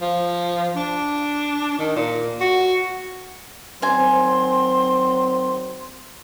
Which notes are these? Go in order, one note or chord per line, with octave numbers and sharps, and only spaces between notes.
F3
D4
D#3
A#2
F#4
D#3 F#3 C4 C5 G#5 C6